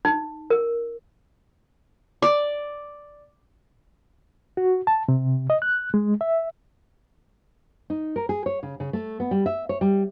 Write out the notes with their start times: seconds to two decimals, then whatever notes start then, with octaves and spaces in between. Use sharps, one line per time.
0.05 D#4
0.50 A#4
2.22 D5
4.57 F#4
4.87 A5
5.08 C3
5.50 D#5
5.62 F#6
5.94 G#3
6.21 E5
7.90 D#4
8.16 A#4
8.29 G#4
8.46 C#5
8.63 C#3
8.80 C#3
8.93 A3
9.20 B3
9.31 G3
9.46 E5
9.69 C#5
9.81 G3